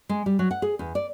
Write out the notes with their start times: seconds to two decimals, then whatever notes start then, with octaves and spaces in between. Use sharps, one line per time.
0.09 G#3
0.26 G3
0.39 F#3
0.51 F#5
0.62 G#4
0.79 E2
0.95 D5